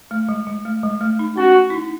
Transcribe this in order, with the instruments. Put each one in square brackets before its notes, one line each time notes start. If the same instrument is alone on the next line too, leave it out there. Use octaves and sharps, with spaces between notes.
[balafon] A3
G#3
G#3
A3
G#3
A3
D#4
[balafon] C#4 [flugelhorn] F#4
[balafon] E4
D#4